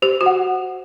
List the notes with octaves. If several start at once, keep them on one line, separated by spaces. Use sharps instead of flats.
G4 C5
F#4
F#5